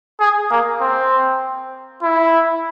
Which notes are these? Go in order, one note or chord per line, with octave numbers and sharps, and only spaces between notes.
G#4
A#3
C4
E4